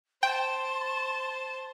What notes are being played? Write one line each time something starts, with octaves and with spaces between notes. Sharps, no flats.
C5 G5 A5 C6